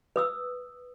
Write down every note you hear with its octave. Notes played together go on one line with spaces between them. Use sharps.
B4 D#6 E6